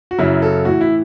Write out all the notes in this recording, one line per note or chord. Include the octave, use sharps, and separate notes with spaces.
F#4
F#2 C#3 F#3 E4
A4
A2 E3 F#4
E4